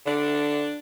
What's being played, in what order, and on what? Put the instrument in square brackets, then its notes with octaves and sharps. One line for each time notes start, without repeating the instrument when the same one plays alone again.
[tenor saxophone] D3 [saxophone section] D4